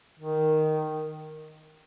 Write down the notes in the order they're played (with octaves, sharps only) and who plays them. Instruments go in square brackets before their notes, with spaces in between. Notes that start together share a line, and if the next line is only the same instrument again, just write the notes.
[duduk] D#3